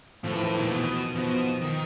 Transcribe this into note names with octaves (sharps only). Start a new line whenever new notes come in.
A2 F3
E3
D#3
E3
A#2
B2 E3
B2 F3
D#3